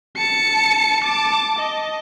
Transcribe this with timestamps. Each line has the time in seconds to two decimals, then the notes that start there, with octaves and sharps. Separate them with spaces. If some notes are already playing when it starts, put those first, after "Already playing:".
0.17 A5 C#7
1.03 A5 D6
1.59 D#5